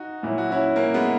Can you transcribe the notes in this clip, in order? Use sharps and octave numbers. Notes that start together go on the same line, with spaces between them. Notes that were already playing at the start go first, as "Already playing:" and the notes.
Already playing: D#4 F#4
A#2 F#3 E4
F#4
C#4 E4
A#3 C#4
G#3 B3